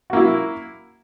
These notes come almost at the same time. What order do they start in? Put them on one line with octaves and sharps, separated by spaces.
F#4 A#3 E4